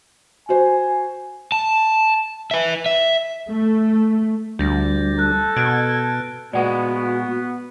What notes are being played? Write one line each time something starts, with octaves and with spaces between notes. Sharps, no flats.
F#4 C5 G#5
A5
B4 E5
E5
A3
D2 G3 D4 G6 A6 A#6
A4 F#6
B2 F6 F#6 G#6 D7
A#2 G#3 B3 F#4 D5 F#5 C#6